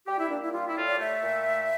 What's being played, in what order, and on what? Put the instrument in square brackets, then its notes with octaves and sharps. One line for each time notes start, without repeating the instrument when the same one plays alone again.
[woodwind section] G3 G4
E4
A#3 D4
E4
G3 F4
E4
A2 F4
D5
A3 E5
A#2
A3